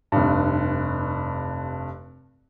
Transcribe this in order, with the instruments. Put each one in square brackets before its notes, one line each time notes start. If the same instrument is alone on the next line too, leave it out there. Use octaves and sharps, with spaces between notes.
[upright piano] F1 G2